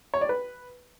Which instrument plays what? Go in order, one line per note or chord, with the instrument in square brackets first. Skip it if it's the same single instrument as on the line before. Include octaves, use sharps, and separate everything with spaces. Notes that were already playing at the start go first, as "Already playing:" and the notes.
[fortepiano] C#5
D5
B4